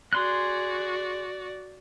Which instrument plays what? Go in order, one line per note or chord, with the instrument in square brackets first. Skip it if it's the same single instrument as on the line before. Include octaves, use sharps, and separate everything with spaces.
[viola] F#4 D5 [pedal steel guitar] G#4 C6 F#6